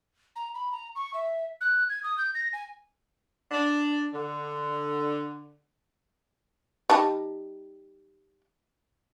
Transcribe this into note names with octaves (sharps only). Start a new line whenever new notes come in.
A#5
B5
A#5
C#6
E5
F#6
G#6
D#6
G6
A#6
G#5
D4
D3
G3 D#4 A5